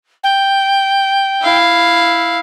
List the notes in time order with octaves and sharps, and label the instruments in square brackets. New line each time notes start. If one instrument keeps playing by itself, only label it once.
[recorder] G5
[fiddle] E4 F5